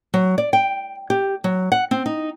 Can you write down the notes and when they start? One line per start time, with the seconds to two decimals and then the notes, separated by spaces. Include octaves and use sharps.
0.14 F#3
0.38 D5
0.53 G5
1.10 G4
1.44 F#3
1.72 F#5
1.91 C4
2.06 D#4